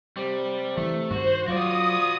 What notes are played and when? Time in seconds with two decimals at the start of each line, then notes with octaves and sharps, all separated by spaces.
0.17 C3 G3
0.77 E3 A3
1.11 G2 D#3 F#4 C5
1.48 F#3 F4 F#4 D5 D#6